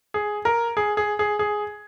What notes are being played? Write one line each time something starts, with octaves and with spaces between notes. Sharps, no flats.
G#4
A#4
G#4
G#4
G#4
G#4